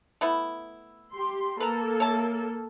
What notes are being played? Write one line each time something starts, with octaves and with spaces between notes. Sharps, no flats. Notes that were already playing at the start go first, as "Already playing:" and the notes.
A3 B3 E4
G4 C6
A#3 A4 B4 A#5
C#5 E5 A5